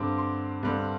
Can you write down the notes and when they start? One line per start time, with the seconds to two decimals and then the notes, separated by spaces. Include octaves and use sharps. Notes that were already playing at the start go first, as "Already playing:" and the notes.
Already playing: G2 D3 G3 C4 D6
0.18 C6
0.63 G2 D3 G3 C4